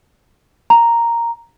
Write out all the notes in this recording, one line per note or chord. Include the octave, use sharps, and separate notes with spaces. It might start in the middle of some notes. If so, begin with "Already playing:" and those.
A#5